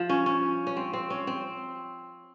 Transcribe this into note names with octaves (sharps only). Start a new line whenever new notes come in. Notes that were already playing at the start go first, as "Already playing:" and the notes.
Already playing: F3
C#4
C#4
C#4
C4
C4
C#4
C4